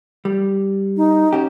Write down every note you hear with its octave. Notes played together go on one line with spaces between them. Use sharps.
G3
D#4
C#4 F#4 G4